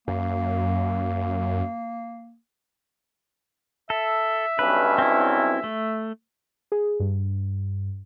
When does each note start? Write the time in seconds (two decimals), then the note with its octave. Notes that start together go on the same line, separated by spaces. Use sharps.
0.08 F#2 A#3
3.90 A4 E5
4.59 B1 G2 C#4 B4
4.98 C4 E4
5.64 A3
6.72 G#4
7.00 G2